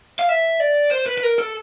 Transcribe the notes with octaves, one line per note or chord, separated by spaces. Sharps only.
F5
E5
D5
C5
B4
B4
A#4
A4